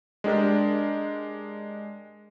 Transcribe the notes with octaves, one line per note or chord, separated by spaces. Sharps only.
G#3 D4 G4 A#4